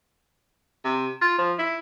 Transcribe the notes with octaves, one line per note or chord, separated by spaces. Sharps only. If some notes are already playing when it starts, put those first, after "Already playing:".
C3
F4
F3
E4